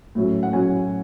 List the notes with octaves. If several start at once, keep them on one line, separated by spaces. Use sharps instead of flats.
A2 F#3 C#4
F#5
A2 F#3 C#4 G#5